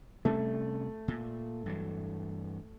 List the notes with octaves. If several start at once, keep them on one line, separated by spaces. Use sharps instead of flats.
C3 G3 A3 C#4
A#2
G2 E3 F#3